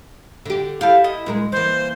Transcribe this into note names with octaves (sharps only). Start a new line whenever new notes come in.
D3 G4
E4 G4 A4 F5
D#5
A#2 G#3 A#4
E3 A#3 C5